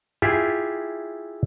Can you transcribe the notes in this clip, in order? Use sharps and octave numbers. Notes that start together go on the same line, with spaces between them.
E4 F4 G4 G#4 E5